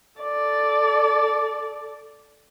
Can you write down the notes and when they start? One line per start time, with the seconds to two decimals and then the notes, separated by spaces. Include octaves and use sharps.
0.21 A4 D5